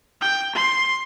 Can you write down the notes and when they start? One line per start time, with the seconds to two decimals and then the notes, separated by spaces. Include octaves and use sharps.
0.22 G5
0.56 C6